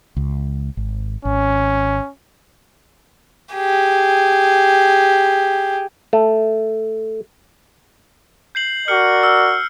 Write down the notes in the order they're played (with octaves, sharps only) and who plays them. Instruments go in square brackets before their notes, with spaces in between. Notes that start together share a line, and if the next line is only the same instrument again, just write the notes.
[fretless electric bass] C#2
G#1
[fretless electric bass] G#1 [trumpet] C#4
[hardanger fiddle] G4 G#4
[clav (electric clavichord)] A3
[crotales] G6 C7 F#7
[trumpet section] F#4 A#4 D5 [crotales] F6 C#7
[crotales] E6 F6